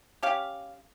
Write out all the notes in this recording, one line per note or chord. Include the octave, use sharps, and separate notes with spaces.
C#4 G4 F5